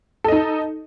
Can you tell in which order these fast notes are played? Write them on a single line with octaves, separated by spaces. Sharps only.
A4 D#5 D#4